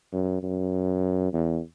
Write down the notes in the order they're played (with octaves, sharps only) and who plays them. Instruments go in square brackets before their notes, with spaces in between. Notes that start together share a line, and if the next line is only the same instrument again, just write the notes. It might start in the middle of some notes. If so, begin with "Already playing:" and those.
[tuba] F#2
F#2
E2